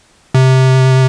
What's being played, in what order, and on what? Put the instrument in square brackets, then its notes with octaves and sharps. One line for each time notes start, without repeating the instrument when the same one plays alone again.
[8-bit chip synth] C3